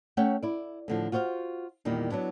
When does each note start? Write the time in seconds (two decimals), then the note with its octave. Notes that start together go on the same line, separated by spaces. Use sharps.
0.17 A3 C#4 C#5 F#5 G5
0.42 E4 D5
0.88 A2 D3 F3
1.12 F4 F#4 C5 D#5 F5
1.85 E2 A#2 D#3 G3
2.11 F#3 B3 D4 E4